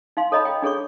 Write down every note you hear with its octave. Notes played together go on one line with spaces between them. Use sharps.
D#4 F5 C6
A4 C#5 D#5 A#5 B5
G5
D4 G#4 A4 C#5 C#6